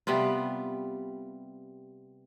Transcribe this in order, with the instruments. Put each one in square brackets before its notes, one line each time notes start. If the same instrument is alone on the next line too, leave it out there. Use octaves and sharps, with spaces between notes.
[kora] C3 G3 B3 F4